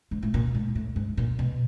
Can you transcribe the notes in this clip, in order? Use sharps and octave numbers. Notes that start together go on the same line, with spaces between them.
G#2
A2
A#2
G#2
A2
G#2
A#2
B2